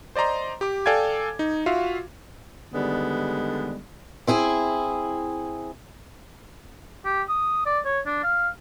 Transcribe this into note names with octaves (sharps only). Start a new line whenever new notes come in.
C5 D5 D#5 A#5 C6
G4 D6
A4 D5 F5 G5 G#5 G#6
D#4
F4 F#4 E5 F5
D3 D#3 G3 G#3 B3
C4 E4 G#4
G4
D#6
D5
C#5
D4
F5